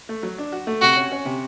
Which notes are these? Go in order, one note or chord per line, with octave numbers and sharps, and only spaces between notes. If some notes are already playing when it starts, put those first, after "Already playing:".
A3
F#3
D4
F#4
A3
C3 F#4
C#4
C#4
C3